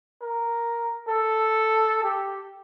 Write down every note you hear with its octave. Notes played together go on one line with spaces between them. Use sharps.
A#4
A4
G4